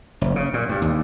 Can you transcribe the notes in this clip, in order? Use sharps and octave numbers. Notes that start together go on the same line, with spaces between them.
F#1
C#3
A#2
G2
D#2